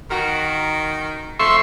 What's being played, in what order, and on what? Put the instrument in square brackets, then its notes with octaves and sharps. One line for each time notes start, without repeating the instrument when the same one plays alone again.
[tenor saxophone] D#3 [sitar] F#4 A#4
[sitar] F2 F3 [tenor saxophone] A3 [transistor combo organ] E5 C6 C#6